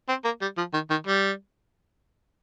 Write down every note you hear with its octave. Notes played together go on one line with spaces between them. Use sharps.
C4
A#3
G3
F3
D#3
D#3
G3